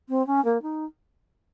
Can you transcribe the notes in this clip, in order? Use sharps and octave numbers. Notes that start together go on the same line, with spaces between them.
C4
C#4
A#3
D#4